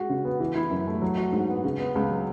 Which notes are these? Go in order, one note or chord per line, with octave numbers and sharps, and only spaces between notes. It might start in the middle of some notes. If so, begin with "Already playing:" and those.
Already playing: G#3 F#4
C#3
B3
E3
E4
F#2
A3
F#3
F#4
G#2
B3
C#3
B3
C#2
F#3